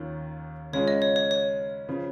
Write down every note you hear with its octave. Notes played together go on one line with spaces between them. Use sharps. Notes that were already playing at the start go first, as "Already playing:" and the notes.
Already playing: D#2 D#3 C#4 F4
C#3 G#3 C#4 F4 C#5
D#5
C#5
C#5
C#5
C#3 F3